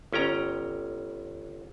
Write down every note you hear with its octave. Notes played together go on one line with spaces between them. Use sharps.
G1 C#4 G5 A#5